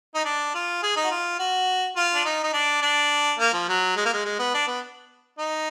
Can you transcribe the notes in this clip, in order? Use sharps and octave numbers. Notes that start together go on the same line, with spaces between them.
D#4
D4
F4
G#4
D#4
F#4
F4
F#4
F4
D4
D#4
D#4
D4
D4
A#3
F3
F#3
G#3
A#3
G#3
G#3
B3
D4
B3
D#4